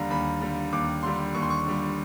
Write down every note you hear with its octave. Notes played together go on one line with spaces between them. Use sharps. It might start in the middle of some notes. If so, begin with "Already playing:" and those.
Already playing: D#2 D3 G3 F5 A#5
D#2 B5
D3 G3
D#2 D6
D3 G3 C6
D#2 C#6
C6
C#6
D3 G3